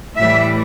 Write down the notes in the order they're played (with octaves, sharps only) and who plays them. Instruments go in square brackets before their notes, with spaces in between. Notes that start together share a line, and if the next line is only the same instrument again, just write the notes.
[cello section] A2 E3 G3 E5